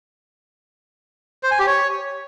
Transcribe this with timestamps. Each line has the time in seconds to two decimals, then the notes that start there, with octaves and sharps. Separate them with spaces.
1.43 C5
1.51 G#5
1.59 G4
1.67 C#5